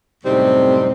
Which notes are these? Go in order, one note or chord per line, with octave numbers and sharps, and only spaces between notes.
F#2 A2 C3 G3 C4 D#4